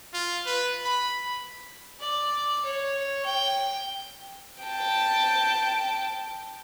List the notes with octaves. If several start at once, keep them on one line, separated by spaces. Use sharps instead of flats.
F4
B4
B5
D5
C#5
G5
G5 A5